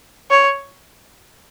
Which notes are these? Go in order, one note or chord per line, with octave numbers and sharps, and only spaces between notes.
C#5